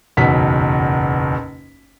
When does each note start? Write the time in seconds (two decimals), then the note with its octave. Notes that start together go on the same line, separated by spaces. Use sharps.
0.17 F#1 B1 E2 B6